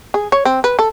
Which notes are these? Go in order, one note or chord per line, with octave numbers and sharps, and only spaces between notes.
G#4
C#5
C4
B4
A4